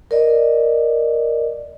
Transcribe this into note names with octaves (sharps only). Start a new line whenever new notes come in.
A#4 D5 D#5